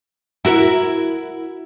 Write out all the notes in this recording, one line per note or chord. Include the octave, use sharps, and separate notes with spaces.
E4 F#4 A#4